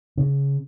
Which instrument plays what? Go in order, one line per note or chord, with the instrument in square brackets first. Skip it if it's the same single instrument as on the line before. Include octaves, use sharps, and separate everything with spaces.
[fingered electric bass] C#3